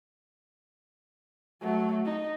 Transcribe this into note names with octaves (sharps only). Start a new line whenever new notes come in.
F#3 A3
D#4